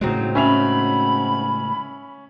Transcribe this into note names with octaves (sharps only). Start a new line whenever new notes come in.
A2 C#3 F#3 G#3 C4 D#4
C#4 E5 B5 F7